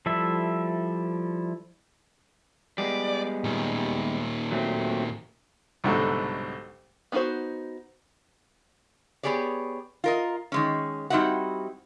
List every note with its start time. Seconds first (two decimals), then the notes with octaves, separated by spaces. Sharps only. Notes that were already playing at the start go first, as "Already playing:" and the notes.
0.06 F3 G3 E4 A4 E5
2.78 G3 G#3 B3 D5
3.44 A#2 D#3
4.52 F#3 A3 C4
5.84 C2 G#2 B2 D3 F#3 A3
7.12 B3 D#4 F4 F#4 C5
9.23 B3 G4 G#4 C#5 D5
10.04 F4 A#4 D#5
10.52 D#3 G#3 C#4
11.10 G3 C4 D#4 E4 F#4 F#5